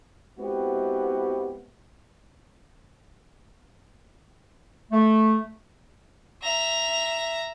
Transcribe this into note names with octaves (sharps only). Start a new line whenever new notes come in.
G#3 B3 C4 E4 F#4 G4
A3
E5 A#5